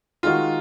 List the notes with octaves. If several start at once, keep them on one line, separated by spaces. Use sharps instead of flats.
D#3 G#3 D#4 F4 F#4